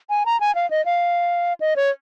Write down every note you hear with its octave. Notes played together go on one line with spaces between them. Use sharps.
G#5
A#5
G#5
F5
D#5
F5
D#5
C#5